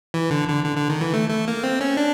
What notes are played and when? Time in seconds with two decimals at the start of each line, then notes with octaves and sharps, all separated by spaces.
0.14 E3
0.31 D3
0.48 D3
0.65 D3
0.77 D3
0.90 D#3
1.01 E3
1.14 A3
1.30 A3
1.48 A#3
1.64 C4
1.81 C#4
1.97 D4